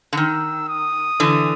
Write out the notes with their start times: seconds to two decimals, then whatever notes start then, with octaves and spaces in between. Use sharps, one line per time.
0.13 D3
0.17 D#3 E6
0.68 D#6
1.20 D3 E3